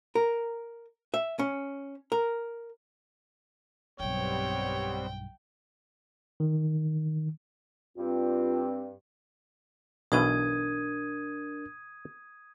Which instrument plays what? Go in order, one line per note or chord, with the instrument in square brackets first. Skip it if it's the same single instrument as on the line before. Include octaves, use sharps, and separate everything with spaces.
[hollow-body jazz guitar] A#4
E5
C#4
A#4
[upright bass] B1 G2 [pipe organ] G3 B3 C4 [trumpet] C#5 [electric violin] G5
[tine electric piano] D#3
[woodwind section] G2 C4 [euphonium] F4
[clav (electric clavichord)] B1 B2 E3 [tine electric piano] D4 A#4 [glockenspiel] D#6 G#6 D#7